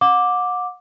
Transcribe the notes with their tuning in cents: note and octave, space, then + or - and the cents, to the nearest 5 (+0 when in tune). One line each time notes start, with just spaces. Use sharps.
F#5 -35 D6 +0